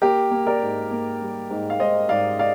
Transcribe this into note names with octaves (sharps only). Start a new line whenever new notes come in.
A#3 G4 A#4
A#3
A#4 D5
G#2
A#3
G3
G#2
F5
G#2 C5 D#5
G#2 D5 F5
D5 F5